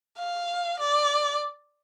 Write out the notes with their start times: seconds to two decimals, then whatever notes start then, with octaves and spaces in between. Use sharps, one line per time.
0.18 F5
0.80 D5